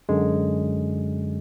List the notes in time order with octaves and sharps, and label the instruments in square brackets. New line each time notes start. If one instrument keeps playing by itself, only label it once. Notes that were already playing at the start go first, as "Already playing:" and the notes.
[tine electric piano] F#2 D3 G#3